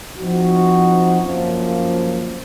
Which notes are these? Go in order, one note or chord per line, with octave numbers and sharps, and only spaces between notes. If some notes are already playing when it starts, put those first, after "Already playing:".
F3 C4 D#4 F#4
F#2 F3 A#3